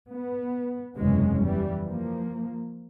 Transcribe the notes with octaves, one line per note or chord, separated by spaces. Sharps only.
B3
F#1 E2 C3 G#3 C#4
E3 G3
F3 A#3